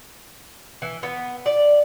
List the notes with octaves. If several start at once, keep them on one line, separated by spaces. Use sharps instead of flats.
E3
B3
D5